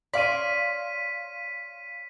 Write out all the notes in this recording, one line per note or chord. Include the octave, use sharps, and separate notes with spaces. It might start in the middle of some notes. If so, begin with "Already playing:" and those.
C#5 D5 F5 C6 B6 D#7